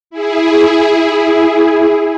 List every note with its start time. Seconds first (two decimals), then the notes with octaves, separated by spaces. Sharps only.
0.10 E4 G#4